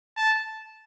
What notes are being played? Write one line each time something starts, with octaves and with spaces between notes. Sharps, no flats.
A5